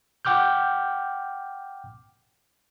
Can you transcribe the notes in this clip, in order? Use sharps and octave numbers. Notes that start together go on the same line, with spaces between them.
F#5 G5 D6 F6 G6